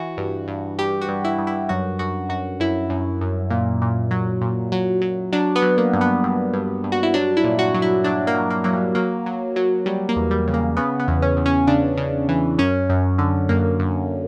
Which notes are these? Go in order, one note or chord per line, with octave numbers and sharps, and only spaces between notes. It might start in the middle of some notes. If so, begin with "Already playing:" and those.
Already playing: E3 F#4
G2
G2
G2 G4
F#4
G2
E4
G2
E4
F#2 F#4
F#2 F#4
F#2 F#4
F#2 E4
F#2
F#2
A#2
A#2
F#3
A#2
F#3
F#3
F#3 D4
B3
F#3
A#3
G2
B3
G2
G2
G2
F#4
E4
F#3 D4
E4
A#2
F#4
F#3
E4
F#3 D4
A#3
F#3
A#3
F#3 A#3
G3
F#3 A#3
F#3
F#3
F#3 G3
A#3
E2
G3
C#3
A#3
C#3 B3
B3
E2
C#4
E2
C#4
C#3 D4
C#3
E3
F#2 C#4
F#2
D3
F#2 A#3
F#2